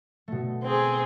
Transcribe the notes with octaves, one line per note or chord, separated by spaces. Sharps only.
B2 A3
C4 G#4